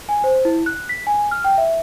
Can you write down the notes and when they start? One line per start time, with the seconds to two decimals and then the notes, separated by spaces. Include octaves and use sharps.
0.09 G#5
0.24 C5
0.45 E4
0.66 F#6
0.89 B6
1.07 G#5
1.31 F6
1.44 G5
1.58 E5